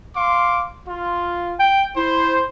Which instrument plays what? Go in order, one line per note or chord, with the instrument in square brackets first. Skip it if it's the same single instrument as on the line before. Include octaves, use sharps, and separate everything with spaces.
[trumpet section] F5 C6 D6
F4
[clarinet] G5
[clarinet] E4 [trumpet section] C5